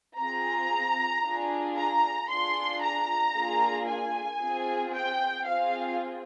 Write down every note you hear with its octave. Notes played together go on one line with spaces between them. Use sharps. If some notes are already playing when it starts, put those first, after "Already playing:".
C4 F4 G#4 A#5
D4 F4 G#4
A#5
D4 F4 G#4 C6
A#5
A#3 D4 F4 G#4
G#5
C4 F4 G#4
G5
C4 F4 G#4 F5